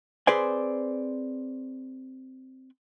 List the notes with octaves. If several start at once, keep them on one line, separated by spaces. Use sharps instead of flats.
C4 G#4 B4 C5 D5 G#5